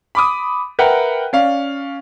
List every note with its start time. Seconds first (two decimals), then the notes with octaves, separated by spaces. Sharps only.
0.15 B5 D6 D#6
0.79 A#4 B4 E5 F#5 G5
1.33 C#4 D5 F5